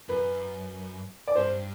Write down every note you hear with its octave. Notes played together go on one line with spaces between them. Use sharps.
F#2 B4
D5
G2 C5